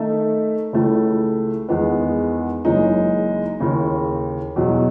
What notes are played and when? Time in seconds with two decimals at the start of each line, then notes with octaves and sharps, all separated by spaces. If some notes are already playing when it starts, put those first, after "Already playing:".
Already playing: D#3 A3 D#4 A4 E5
0.73 C#2 C#3 E3 A3
1.69 E2 D#3 G#3 B3
2.65 F#1 F#2 E3 G#3 D#4
3.60 D#2 C#3 E3
4.56 E2 B2 F#3